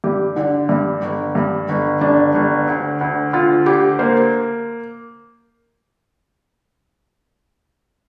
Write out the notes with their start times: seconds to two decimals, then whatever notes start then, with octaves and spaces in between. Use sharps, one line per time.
0.04 G2 G4
0.36 D3
0.69 G2
1.03 G1
1.35 G2
1.69 G1
2.01 G1 D4
2.34 G1
2.67 D2
3.01 D2
3.33 D2 F4
3.66 D2 G4
3.99 A#3 C5